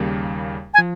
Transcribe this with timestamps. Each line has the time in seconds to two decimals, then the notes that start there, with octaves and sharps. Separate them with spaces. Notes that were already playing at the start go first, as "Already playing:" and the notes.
Already playing: D#2 C#3 G3 A#3
0.74 G#5
0.78 F3